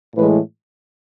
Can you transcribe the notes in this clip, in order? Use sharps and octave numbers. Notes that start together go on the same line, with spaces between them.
A2 E3 G#3 B4